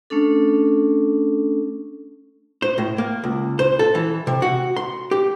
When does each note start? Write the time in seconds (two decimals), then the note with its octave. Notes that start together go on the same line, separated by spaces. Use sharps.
0.10 A3 C#4 D4 A4
2.62 C5
2.78 A2
2.98 A#3
3.24 C#2
3.59 C5
3.79 A4
3.95 E3
4.27 C3
4.42 F#4
4.76 C6
5.11 G4